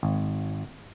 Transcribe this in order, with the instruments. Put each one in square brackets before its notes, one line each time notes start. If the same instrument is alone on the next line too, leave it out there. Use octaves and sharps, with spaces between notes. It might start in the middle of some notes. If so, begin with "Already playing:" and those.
[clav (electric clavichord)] G#1